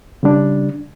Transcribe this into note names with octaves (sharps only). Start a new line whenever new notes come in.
C#3 G3 D4